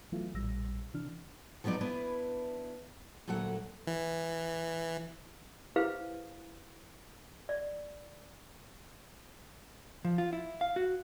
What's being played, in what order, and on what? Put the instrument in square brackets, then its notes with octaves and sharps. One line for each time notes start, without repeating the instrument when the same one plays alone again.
[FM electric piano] E3 F#3 A3 B3 E4 F4
A#1 A2 G3 E6 A#6
C3 E3 D4 F6
[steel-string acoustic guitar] F3 F#3 B3 D#4 D5
B3 D4 E4 B4
D2 A#2 F#3 A4 F#5
[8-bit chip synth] E3
[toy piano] E4 G4 G#4 B4 C5 F5
D5
[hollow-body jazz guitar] F3
F4
E4
F5
F#4